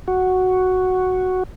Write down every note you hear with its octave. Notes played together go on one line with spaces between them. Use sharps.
F#4